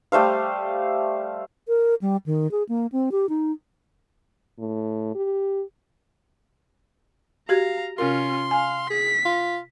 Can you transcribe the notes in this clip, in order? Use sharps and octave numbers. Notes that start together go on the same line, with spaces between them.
G3 A3 C5 F5
A#4
G3
D#3
G#4
A#3
C4
G4
D#4
A2
G4
F#4 G4 F5 A#5 G#6
C3 C#4 F4 A#4 C6
F5 G#5
G#4 B6
F4